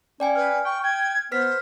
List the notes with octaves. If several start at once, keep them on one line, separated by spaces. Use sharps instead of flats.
C#4 D5 G5 G#5
B4 F6
G5 C#6
G5 G#6
B3 B4 C5 F6 B6